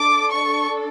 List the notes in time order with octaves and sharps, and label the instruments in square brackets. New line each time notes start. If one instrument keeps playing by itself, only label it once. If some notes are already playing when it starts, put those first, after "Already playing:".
Already playing: [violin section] D4 A4 D6
C#6